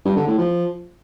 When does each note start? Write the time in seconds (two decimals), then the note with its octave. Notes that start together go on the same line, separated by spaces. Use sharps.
0.05 G2
0.16 D3
0.27 A2
0.38 F3